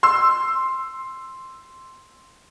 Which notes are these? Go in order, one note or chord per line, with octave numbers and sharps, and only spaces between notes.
C6 E6